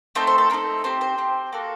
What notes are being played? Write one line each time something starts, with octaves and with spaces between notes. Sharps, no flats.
A3 C4 D#4 A4 C5
C5
A4
A3 C4 D#4 A4 A#4
C4 G4 C5
C5
C4 G4
A#3 F#4 A4